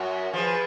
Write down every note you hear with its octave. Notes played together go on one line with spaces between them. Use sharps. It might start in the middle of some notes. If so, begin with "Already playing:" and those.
Already playing: F#2 F#4 A#4
F3 G#4 B4